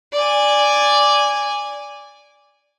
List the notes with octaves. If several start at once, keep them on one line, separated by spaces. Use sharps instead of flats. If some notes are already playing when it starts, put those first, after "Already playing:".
D5 G#5